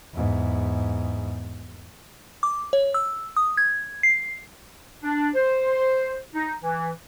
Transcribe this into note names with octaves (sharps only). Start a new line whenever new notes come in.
E2 G#2
D6
C#5
E6
D#6
G#6
C7
D4
C5
D#4
E3